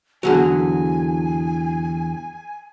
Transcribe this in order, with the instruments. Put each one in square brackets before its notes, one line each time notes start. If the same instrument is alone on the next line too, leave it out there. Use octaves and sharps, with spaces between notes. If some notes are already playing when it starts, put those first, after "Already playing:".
[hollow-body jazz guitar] E2 D3 F#3 [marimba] F#4 G#4 [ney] G#5